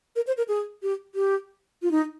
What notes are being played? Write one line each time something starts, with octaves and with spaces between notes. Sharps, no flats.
A#4
C5
A#4
G#4
G4
G4
F4
D#4